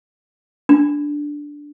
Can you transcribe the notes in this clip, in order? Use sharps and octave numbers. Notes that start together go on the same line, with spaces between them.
D4